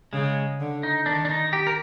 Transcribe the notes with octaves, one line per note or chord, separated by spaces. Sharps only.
C#3 G#3
D3
D#4
D#3 D4
D4
D#4
G4
A#4